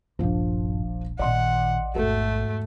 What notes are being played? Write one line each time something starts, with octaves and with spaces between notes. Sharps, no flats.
D#1 A#1 G2 F3 D4
A1 A#2 D#3 D5 D#5 F#5 C6
E2 G#2 A3 F#4 A4